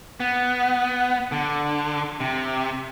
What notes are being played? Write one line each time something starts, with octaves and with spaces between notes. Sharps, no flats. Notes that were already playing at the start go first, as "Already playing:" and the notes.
B3
D3
C3